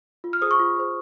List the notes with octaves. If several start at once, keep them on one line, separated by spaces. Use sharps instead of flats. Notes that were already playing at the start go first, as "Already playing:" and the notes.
F4
F6
G#4 C5 D#6
C#6
F4
G#4 C5